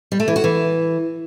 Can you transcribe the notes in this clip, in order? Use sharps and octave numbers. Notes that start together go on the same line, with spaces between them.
G3
A3
E3
F#4
E3